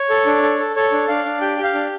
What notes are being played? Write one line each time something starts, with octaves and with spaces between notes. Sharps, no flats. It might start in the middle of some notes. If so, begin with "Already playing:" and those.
Already playing: C#5
A4
D4
A4
A4
A4 C#5
D4
D4 F5
D4
G4 G5
G4
F5
D4